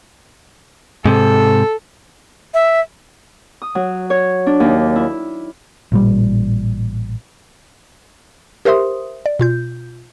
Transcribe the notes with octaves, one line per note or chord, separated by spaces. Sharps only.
G#2 C3 A4
E5
D#6
F#3
C#5
D4
D#2
E4
A1 A#2 G3
G4 A#4 C5 E5 C6 D#6
D5
B2 F4 G6